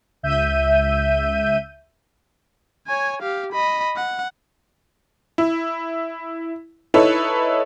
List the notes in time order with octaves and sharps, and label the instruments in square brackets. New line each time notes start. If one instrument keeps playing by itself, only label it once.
[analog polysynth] C#2 E5 G6 D#7
[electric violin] C#5 G#5
G4 F5
D#5 B5
F#5
[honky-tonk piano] E4
D#4 E4 A4 B4 C#5